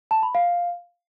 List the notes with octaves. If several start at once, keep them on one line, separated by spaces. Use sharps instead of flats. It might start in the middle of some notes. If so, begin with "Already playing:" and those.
A5
B5
F5